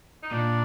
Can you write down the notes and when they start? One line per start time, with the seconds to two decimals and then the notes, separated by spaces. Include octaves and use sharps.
0.23 D#4
0.31 A#2 D4